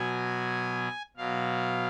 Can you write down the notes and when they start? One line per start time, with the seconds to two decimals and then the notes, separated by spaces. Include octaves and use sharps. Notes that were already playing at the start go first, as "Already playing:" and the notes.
Already playing: B2 F#3 G#5
1.17 B2 F#3 F5